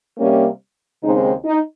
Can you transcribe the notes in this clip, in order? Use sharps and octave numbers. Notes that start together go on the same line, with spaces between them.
C3 G3 A#3 C#4
D#2 C#3 G#3 C4 D#4
D#4